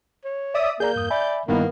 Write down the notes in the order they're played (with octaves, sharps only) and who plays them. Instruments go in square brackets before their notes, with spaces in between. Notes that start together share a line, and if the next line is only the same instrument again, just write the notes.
[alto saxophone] C#5
[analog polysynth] D5 E5 D#6
[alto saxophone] A#3 [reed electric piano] G#4 D5 A#5 [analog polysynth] G6
[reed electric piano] E2 G2 D#6
[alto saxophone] D5 [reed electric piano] E5 G#5 B5
[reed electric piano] G2 G3 E4 [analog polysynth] D#3 B3 [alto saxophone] A#3